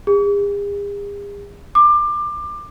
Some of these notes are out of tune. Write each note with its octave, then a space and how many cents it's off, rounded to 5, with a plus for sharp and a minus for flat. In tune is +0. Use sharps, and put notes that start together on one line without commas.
G#4 -45
D6 +25